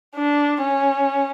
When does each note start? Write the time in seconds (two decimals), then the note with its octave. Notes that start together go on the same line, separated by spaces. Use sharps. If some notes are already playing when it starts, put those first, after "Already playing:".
0.15 D4
0.61 C#4